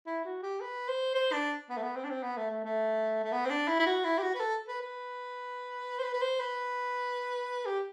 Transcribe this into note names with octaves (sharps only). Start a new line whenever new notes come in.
E4
F#4
G4
B4
C5
C5
D4
B3
A3
B3
C4
D4
C4
B3
A3
A3
A3
A3
B3
C4
D4
E4
E4
F#4
E4
G4
F#4
B4
A4
B4
B4
C5
B4
B4
C5
B4
G4